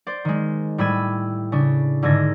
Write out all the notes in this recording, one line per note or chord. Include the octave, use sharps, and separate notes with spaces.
C5 D5
D#3 G#3
A2 G3 B5 E6 G#6 D#7
C#3 D4
G#2 D3 D#3 A4 G#6 A#6